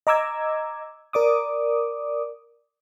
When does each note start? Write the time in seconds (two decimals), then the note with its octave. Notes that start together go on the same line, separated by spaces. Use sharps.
0.07 D#5 A#5 D6 E6 G#6
1.13 A#4 D5 D6 D#6